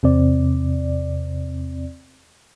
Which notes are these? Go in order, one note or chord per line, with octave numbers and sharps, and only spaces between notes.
E2 C3 C4 D5